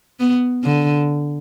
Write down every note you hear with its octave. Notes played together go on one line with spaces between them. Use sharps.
B3
D3